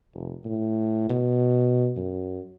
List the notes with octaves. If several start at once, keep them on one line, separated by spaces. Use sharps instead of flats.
F1
A2
B2
F#2